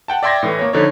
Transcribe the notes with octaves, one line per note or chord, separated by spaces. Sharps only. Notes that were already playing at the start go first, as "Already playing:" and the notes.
F#5 G5 A5
D5 E5 G5 C6 G#6 A#6
A2 E3 A3
A#3 C#5
D3 F3 D#4 A4 C#5